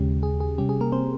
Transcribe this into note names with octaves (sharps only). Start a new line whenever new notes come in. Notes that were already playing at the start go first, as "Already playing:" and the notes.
Already playing: D#2 C#3 G#3 C#4 G4
G#4
G#4
C3 G3 C#4 G4
G#4
A#3 A#4
C4 C5